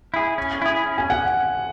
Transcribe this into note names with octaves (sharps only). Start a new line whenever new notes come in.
E4 G#4
C#4
E4 G#4
C#4
G#5
F#5